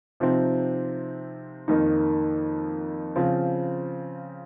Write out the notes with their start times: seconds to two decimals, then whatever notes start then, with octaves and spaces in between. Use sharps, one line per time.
0.20 C3 F3 C4 D#4
1.68 F2 D#3 A#3 D#4
3.16 C#3 F3 C4 F4